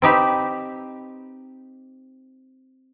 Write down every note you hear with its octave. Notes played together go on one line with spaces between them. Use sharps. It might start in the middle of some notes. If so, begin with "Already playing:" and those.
C4 D#4 G4 B5